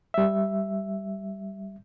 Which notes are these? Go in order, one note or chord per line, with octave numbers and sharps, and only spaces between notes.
G3 E5